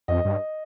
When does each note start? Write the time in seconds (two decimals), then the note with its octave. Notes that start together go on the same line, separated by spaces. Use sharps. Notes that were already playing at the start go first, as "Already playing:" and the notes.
0.08 F2 D#5
0.25 G2